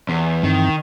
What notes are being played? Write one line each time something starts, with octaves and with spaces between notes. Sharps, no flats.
E2
G2 D#3 E3 C4